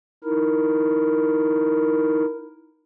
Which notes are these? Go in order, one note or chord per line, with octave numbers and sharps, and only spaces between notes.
D#4 E4 A#4